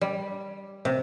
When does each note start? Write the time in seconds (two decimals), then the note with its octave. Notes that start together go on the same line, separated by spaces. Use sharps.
0.01 G3
0.85 C3